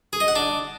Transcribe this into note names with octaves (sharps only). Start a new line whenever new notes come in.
G#4
D#5
F#5
D4